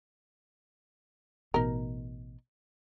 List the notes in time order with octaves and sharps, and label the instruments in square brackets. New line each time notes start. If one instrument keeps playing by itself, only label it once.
[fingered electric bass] A1 B2 [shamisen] D#4 A#4